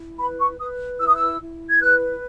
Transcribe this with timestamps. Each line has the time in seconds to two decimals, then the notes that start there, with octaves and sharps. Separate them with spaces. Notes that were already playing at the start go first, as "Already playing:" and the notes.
Already playing: E4
0.19 B4 B5
0.40 C#6
0.60 B4 D#6
1.00 E4 E6
1.08 D#6
1.15 E6
1.41 E4
1.70 G#6
1.81 B4 F#6